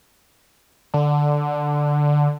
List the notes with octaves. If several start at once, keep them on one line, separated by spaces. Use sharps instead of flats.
D3